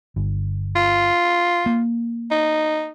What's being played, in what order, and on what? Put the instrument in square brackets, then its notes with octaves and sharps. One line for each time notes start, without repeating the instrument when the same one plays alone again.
[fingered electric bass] G1
[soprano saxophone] F4
[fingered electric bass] A#3
[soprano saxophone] D#4